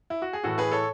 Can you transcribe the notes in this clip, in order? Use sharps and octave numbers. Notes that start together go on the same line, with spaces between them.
E4
F#4
G#4
A2 E3 F#4 A4
G#4 B4
A4 C#5